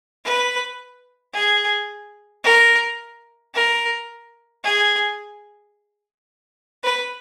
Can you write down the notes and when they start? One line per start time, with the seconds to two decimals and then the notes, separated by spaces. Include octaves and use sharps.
0.24 B4
1.34 G#4
2.44 A#4
3.54 A#4
4.64 G#4
6.84 B4